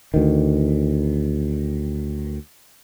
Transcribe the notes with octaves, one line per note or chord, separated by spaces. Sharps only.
D2 D#3